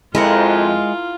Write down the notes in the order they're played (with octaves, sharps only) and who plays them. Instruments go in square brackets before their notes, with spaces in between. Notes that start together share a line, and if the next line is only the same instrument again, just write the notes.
[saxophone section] F2 [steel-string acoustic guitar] G#3 [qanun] E4 A#4 F#5 [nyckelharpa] F4